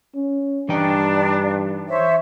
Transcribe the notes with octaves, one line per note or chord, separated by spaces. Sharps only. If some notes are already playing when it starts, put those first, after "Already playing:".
C#4
G2 E3 D4 D#4 G5
C5 C#5 E5